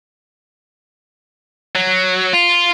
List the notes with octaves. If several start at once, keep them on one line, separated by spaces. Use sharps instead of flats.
F#3
F4